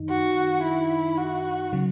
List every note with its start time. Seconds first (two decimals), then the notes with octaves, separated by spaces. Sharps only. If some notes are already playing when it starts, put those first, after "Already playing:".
Already playing: F#2 D#3 D#4
0.10 F#4
0.63 E4
1.18 F#4
1.73 C#3 F#3